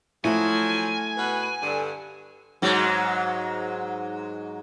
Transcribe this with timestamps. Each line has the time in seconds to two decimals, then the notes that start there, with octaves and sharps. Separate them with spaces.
0.24 F3 F#3 A3 E4 G#5
1.16 B2 F#4 B4
1.62 G2 D3
2.62 G#2 F#3 G#3